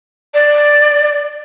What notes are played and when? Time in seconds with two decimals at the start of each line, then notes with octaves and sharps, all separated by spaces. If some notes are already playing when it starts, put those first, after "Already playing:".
0.34 D5